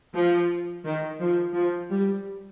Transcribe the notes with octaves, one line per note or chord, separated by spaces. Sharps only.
F3
D#3
F3
F3
G3